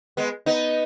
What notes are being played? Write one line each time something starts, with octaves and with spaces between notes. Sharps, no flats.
G#3 B3
B3 D#4